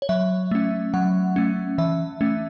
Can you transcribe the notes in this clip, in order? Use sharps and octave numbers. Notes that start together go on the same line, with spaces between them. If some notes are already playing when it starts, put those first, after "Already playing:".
C#5
F#3 E5
A3 C#4
F#3 F#5
A3 C#4
E3 E5
A3 C#4